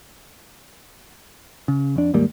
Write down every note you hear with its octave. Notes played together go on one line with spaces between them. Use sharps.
C#3
F2 D4
D#2 G#2 G3 A#3